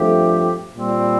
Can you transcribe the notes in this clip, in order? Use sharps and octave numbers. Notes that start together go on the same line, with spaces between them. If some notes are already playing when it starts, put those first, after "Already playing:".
Already playing: G2 F3 A3 C4 G4
A#2 G3 C4